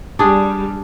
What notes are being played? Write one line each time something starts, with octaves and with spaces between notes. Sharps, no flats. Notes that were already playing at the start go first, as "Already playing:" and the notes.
G3 D4 G#4